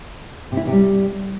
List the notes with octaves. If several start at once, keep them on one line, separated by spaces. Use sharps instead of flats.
C3
E4
E3
C3
G3